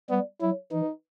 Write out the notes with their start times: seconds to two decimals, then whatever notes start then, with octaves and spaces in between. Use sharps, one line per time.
0.10 G3 B3
0.41 F#3 E4
0.72 E3 D#4